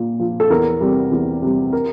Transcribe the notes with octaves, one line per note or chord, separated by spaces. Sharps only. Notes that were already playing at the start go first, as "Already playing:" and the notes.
Already playing: A#2
F3
A4
E2 A#4
C3 G3
E2
C3 G3
A#4